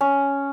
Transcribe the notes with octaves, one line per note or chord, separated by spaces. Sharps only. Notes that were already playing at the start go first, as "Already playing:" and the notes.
C#4